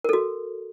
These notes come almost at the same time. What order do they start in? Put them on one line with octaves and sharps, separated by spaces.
A#4 A4 F#4